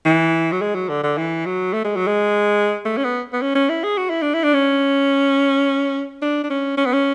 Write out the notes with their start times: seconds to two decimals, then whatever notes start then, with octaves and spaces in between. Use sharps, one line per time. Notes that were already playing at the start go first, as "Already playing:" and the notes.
0.05 E3
0.52 F#3
0.62 G#3
0.75 F#3
0.89 D3
1.03 D3
1.18 E3
1.46 F#3
1.73 A3
1.85 G#3
1.96 F#3
2.07 G#3
2.85 A3
2.97 C#4
3.04 B3
3.33 B3
3.41 C#4
3.55 C#4
3.69 E4
3.84 G#4
3.97 F#4
4.10 E4
4.22 D4
4.34 E4
4.44 D4
4.54 C#4
6.22 D4
6.44 D4
6.50 C#4
6.77 C#4
6.86 B3
6.93 C#4